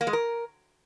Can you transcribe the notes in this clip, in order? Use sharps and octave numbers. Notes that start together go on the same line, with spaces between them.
A#3
G#3
A#4